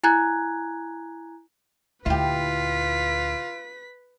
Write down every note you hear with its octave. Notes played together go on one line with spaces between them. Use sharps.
E4 G#5 A#5 F#6 G#6
D2 A#2 E4 F4 G4 B4 B6